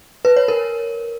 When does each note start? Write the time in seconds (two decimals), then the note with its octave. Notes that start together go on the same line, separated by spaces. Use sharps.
0.25 B4
0.36 C#5
0.48 A#4